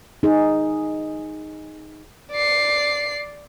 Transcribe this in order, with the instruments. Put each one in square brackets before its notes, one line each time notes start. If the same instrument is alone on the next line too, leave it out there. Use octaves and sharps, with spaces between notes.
[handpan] D#4 G#4
[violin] D5 C7